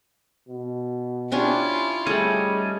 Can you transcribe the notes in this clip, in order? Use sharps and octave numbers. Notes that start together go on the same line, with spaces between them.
B2
C#4 D4 E4 F4 G4
G3 A3 C#4 D#4 G#4